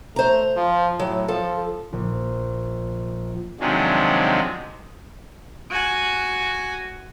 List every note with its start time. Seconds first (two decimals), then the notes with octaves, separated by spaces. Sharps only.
0.16 A3 C5 A#5
0.57 F3
0.99 A2 F#3
1.28 F3 A4
1.93 A#1
3.60 C3 D#3 F3 F#3 G#3 D4
5.70 F#4 G#5